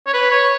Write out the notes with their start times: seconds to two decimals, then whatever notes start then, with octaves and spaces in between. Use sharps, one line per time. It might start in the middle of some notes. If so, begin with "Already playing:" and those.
0.07 C#5
0.14 B4
0.31 C#5